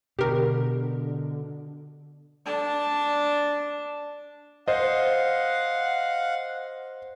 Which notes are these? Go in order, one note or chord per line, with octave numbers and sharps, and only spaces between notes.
B2 D3 G4 A#4
D4 A5
C5 D#5 F5 F#5